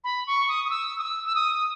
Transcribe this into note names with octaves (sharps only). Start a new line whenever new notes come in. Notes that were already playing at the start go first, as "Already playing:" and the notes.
B5
C#6
D#6
D#6
E6
D#6
E6
E6
D#6